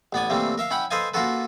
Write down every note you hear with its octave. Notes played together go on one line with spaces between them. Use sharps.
A1 B3 D5 G#5
C3 E3 G3 A3 A#3 C4
A#4 E5 F5
C#4 E4 F#5 G5 B5
A4 B4 C5 D#5 F5 G#5
A#3 C#4 F4 F#4 A4 B4